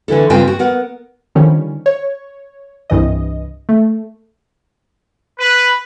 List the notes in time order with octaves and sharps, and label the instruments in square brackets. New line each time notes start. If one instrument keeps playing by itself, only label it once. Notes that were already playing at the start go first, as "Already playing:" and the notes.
[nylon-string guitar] D3 E3 E4 A4
G2 C#3 C4 F4 G5 G#5
F#4
B3 A#4 F#5
[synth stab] D3 D#3 F3 G3 C#4
C#5
C2 G2 E3 D#5
A3
[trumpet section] B4